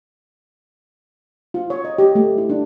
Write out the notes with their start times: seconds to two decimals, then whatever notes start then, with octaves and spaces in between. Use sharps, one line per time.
1.54 F4
1.70 C#5
1.85 D#5
1.98 G4
2.15 A3
2.38 E4
2.49 D4